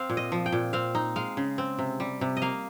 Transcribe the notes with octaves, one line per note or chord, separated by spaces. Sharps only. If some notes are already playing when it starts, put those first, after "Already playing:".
Already playing: C4 F5
A#2
D#5
F3
G5
A#2
C4 F5
D#4
G#3 F5
C#3
C4
C3
G3
C3
D#5
A#3 F5